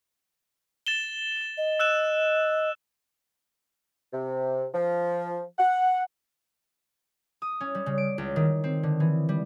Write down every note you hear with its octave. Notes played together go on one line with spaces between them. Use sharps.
A6 E7 G7
D#5
E6 F#6 E7
C3
F3
F#5
D#6
C#4
G3
C#3
D7
C#2
D#3
C4
D3
E3
G3